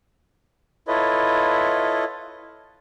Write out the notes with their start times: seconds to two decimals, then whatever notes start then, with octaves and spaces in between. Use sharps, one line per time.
0.88 E4 F4 A4 B4 C#5 D#5